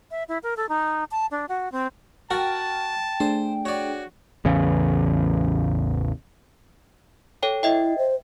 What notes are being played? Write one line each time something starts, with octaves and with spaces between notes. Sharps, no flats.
E5
E4
A#4
A4
D#4
A5
D4
F#4
C4
F#4 A#4 F#5 G5 A5 F6 A6
A3 D4 G#4 C5
F#4 C#5 D5
A1 E2 C#3
A4 C#5 G5
E4 D#5 E5 G5
C5